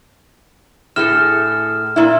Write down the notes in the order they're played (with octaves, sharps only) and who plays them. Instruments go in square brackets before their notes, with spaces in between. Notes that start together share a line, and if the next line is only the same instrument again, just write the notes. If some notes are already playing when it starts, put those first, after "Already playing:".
[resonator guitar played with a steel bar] A2 G#4 A4 [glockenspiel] F6 E7
[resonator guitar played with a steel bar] A#2 E4